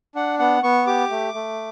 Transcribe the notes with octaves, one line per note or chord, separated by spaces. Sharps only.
D4 F#5
B3 F#5
B3 C#6
G4 D6
A3
A3